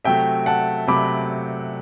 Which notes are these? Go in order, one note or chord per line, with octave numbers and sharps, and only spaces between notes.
C3 F#3 A3 E5 G5
F#5 A5
C3 F#3 A3 B5 D6